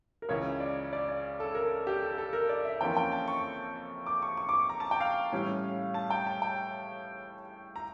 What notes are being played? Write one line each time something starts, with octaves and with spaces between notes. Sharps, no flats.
A#4
C#2 C#3 E3 C#5
D5
D5
D5
A4
A#4
G4
A4
A4
A#4
D5
E5
F2 E3 A#3 C#4 F4 G5
G5
A5
C#6
D6
C#6
C#6
D6
C#6
A#5
A5
G5
F5
A2 E3 G3 C#4
A5
G5
A5
G5
A#5